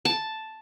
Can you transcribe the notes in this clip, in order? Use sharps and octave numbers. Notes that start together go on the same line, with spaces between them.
A5